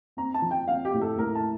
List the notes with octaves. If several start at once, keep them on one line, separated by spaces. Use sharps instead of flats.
C4 A#5
A5
F3
G5
C4 F5
G4
A2
A4
A2 A#4
A5